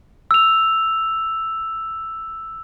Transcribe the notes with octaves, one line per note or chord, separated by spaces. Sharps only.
E6 F7